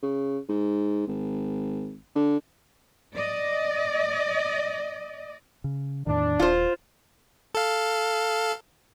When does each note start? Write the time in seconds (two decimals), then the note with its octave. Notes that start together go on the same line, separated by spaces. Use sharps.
0.03 C#3
0.49 G#2
1.07 G#1
2.15 D3
3.15 D5 D#5
5.64 C#3
6.07 E2 A2 D#3 D4
6.40 D#1 F4 C5
7.55 A4 F5